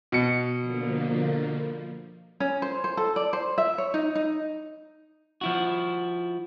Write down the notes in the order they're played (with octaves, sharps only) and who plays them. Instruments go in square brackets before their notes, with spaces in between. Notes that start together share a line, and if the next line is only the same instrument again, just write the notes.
[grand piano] B2 C#7
[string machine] D3 F3 A#3
[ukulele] C#4
C5
C5
A4
D5
C5
E5
C#5
D#4
D#4
[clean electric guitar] F3 E4 F#4